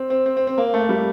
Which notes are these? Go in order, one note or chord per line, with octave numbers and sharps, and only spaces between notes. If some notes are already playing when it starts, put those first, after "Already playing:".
Already playing: C4
C4
C4
C4
C4
A#3
A3
G3